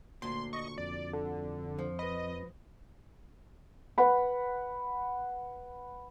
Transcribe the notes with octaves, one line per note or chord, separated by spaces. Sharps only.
D2 A#2 C6
D#5 C#6
F2 D5
D3 A4
F3
B4 D#5 B5
B4 F#5 B5